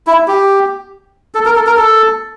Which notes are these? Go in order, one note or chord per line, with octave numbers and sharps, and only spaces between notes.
E4
G4
A4
A#4
A4
A#4
A4